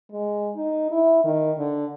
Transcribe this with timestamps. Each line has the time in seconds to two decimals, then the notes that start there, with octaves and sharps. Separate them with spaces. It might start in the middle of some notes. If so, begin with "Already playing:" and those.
0.12 G#3
0.56 D#4
0.91 E4
1.24 D#3
1.58 D3